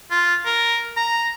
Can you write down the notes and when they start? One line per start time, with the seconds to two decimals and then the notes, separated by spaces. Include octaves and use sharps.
0.11 F4
0.45 A#4
0.97 A#5